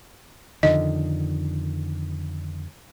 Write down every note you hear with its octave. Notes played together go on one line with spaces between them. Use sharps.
F2 D3 D#3 D#5